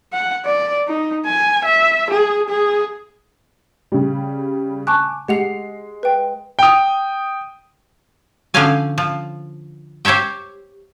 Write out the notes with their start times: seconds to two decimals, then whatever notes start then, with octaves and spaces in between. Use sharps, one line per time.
0.13 F#5
0.46 D5
0.88 D#4
1.26 G#5
1.65 E5
2.10 G#4
2.49 G#4
3.92 C#3 G3
4.87 G#5 A5 C#6 D6 F#6
5.28 G#3 G4 F#5 C7 F7
6.03 B4 G5
6.59 G5 D#6
8.54 D3 F3 C#4 C5 F5 G#5
8.98 F3
10.05 G4 C5 C#5 E5 G5